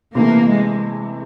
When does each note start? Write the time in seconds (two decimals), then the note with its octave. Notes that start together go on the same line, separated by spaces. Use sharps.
0.14 C3 E3 A3 A#3
0.49 G#3
0.83 G#3